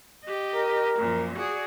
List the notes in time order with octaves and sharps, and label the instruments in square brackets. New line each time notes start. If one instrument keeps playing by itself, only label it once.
[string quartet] G4 D#5
[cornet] A#4
[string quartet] F#2 A#2 F3
F#4 G#4 D5